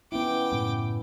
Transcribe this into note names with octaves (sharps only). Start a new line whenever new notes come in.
B3 C#4 E4 G5 D6
F#2 A2 C#3